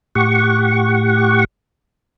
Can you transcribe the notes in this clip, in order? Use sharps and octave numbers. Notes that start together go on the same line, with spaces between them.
A2 G4 F#5 C#6